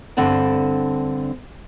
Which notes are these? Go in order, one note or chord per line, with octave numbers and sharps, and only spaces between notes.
G2 D3 C4 F#5 A5